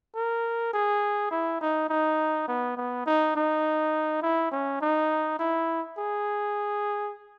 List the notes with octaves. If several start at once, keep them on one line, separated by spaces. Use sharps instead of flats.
A#4
G#4
E4
D#4
D#4
B3
B3
D#4
D#4
E4
C#4
D#4
E4
G#4